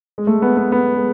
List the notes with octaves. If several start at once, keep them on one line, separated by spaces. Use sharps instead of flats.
G#3
A3
B3
B3
B3
G#3